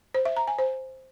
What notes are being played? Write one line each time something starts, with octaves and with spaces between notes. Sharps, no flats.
C5
E5
A#5
G#5
C5